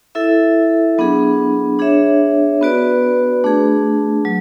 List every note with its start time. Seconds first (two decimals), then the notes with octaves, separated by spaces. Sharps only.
0.15 E4 A4 E5
0.98 F#3 B3 D4 G#4
1.79 D4 G#4 C#5 E5
2.61 B3 F#4 B4 D5
3.44 A3 D4 G#4
4.25 F#3